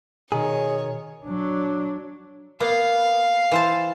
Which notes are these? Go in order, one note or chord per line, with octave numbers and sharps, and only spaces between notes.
B2 D#3 G#4 C#5
F#3 D4
A#3 B3 F5
E3 C5 A5